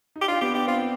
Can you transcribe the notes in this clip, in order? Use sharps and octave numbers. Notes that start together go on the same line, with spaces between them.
D#4
G4
D4 F4
B3 G4
D4 G4
C4 F4